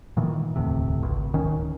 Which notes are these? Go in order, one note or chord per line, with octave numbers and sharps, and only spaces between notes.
A#2 D#3 E3
E1 D2 A2 C3
G#1 C#2
D1 D#3 C#4